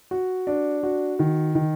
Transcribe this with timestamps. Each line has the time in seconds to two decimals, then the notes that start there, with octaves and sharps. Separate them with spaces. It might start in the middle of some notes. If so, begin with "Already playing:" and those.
0.11 F#4
0.47 D4
0.83 F#4
1.19 D#3
1.55 D#3